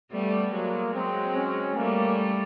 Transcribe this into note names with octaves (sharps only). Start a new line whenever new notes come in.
G3 A3 B3
F#3 G#3 A#3
F#3 G#3 C4
C#4
G3 A3 A#3